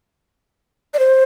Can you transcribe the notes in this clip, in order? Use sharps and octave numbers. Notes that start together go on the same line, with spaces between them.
D5
C5